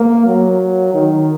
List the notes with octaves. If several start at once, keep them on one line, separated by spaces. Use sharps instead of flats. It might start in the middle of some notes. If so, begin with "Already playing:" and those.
Already playing: A#3
F#3
D#3